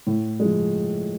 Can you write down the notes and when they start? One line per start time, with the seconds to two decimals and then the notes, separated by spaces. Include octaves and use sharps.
0.07 A2
0.40 G#3
0.45 F3